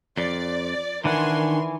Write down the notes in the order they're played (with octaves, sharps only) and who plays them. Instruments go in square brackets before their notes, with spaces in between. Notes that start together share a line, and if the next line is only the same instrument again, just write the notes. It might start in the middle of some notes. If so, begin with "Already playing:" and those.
[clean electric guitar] F2 [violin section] D5
[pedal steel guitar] D#3 D4 F#5 [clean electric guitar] E3 [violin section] A#4 G#5 C6